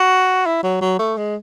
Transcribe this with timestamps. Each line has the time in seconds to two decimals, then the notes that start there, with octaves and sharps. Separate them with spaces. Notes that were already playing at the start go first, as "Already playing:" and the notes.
Already playing: F#4
0.46 E4
0.63 F#3
0.81 F#3
0.99 A3
1.17 G#3